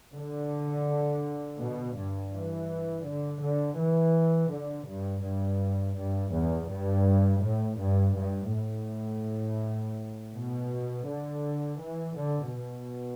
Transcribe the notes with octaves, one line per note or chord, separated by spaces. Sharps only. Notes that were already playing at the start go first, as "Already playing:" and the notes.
D3
B2
G2
E3
D3
D3
E3
D3
G2
G2
G2
E2
G2
A2
G2
G2
A2
B2
D3
E3
D3
B2